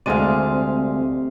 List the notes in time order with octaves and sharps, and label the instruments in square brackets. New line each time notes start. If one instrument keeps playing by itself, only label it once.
[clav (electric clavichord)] D2 G#3 D5 [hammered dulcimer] C3 F5 [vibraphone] C4